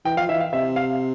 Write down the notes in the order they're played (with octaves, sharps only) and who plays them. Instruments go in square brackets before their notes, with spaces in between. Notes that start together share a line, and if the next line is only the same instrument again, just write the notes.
[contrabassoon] E3 [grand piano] G5
[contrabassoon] F3 [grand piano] F5
[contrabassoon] E3 [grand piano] E5
[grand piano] F5
[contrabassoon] C3 [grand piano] E5
[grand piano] F5